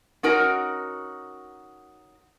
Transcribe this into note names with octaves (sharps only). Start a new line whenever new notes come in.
C#4 D#4 F#4 A#4